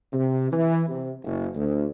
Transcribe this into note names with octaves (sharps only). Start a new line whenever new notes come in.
C3
E3
C3
F#1
D2